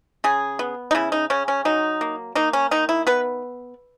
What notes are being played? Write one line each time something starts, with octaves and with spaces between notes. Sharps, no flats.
C#3 G#4
B3
D#4
C#3 E4
D#4
C#3 C#4
C#4
F#3 D#4
A#3
A#3 D#4
C#4
D#3 D#4
E4
B3 B4